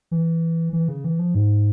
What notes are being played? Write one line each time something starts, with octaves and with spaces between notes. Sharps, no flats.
E3
E3
C#3
E3
F3
G#2